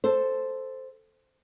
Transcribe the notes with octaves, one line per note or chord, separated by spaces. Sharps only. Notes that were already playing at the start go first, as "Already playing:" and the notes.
A4 C5